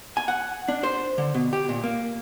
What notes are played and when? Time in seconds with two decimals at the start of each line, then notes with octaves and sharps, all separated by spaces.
0.17 G#5
0.28 F#5
0.68 D4
0.83 C5
1.18 D3
1.34 B2
1.53 G4
1.69 A#2
1.83 A#3